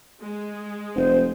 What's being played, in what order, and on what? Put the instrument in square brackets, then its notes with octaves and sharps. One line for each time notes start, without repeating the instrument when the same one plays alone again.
[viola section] G#3
[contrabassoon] F1 [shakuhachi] C5